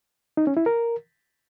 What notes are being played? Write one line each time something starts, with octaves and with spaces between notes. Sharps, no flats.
D#4
C#4
E4
A#4